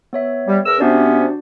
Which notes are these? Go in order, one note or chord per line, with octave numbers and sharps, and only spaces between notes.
B3 C#5 E5
G3
E2 A#4 E6
C3 B3 C#4 D4 F#4 D5